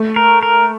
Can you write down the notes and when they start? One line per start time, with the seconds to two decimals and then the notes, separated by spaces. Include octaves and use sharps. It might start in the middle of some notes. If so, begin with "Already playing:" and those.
Already playing: A3
0.16 A#4
0.43 A#4